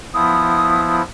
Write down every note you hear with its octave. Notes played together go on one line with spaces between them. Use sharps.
F3 B3 E4 D#6